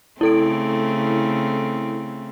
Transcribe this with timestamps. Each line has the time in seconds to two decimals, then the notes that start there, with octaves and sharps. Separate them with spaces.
0.21 C#3 A3 C4 E4 A4 D7